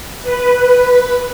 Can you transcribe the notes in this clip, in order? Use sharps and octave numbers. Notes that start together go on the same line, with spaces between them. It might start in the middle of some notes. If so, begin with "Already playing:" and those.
B4